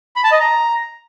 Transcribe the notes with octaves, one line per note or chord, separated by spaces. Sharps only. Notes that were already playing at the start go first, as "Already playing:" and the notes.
B5
A5
D#5
A#5